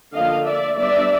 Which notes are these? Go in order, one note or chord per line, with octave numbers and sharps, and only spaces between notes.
D3 F3 A#3 D4 D#5 F5
D5 E5
G3 B3 D4 D5 E5